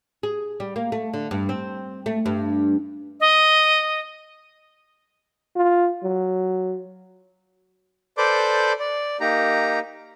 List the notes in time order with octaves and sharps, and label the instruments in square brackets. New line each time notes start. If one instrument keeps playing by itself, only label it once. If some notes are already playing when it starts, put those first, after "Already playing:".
[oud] G#4
G3
A#3
A3
D3
G2
C4
A3
G2
[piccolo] D#5
[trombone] F4
F#3
[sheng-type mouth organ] A4 B4 C5 D5 D6 G6
D5
A#3 D#4 G4 A#5